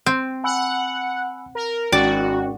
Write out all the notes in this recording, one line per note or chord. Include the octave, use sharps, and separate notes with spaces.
C4
F#5 G#5 B5 E6
A#4
G#1 C#4 F#4 D5 G5